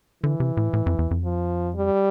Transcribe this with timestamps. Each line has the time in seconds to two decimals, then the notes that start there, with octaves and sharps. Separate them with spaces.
0.23 D3 E3
0.40 C3
0.57 A2
0.73 A2
0.86 F2
0.99 E2
1.11 F2
1.24 F3
1.75 G3